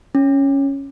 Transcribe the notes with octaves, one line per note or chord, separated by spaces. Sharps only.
C#4